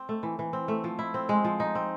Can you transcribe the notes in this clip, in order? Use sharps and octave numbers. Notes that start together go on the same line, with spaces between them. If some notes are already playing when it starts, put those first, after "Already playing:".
Already playing: C4
A3
E3
E3
C4
A3
F3
E4
C4
G#3
F3
D#4
C4